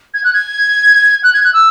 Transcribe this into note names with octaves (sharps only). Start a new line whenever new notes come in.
G#6
F#6
G#6
F#6
G#6
F#6
E6